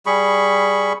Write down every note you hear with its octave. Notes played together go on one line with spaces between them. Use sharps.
G3 G#4 B5 C#6